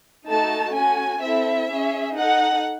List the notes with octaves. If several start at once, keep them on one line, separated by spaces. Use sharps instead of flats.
A3 D#4 F#4 A4 A5
C#4 F#4 A4 G#5
C4 E4 A4 E5
C#4 G#4
D#4 A4 F#5